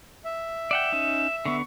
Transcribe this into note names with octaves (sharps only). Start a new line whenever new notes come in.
E5
D5 F#5 G5 E7
C#4 D#4
D3 B3 C#6